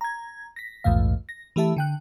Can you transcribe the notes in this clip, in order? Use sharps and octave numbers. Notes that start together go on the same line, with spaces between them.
A#5 G#6
A#6 B6
A#1 E2 G#2 A3 F5
A#6
E3 A3 G4 E5 A5
D3 G5 F#6